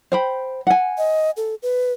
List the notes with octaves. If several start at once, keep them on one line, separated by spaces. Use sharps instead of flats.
C5 G5 B5
F#5 G#5
D#5
A4
B4